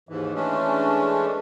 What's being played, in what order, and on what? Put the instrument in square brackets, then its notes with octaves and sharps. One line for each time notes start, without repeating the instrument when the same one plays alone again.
[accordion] D#2 G#2 E3
E3 G#3 A3 C#4 D4